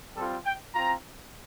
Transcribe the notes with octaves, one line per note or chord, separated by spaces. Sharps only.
G3 C4 F4 A4
G5
C4 F4 A#5